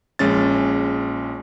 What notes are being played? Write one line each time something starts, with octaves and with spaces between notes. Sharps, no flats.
A#1 G#3 C#4 A6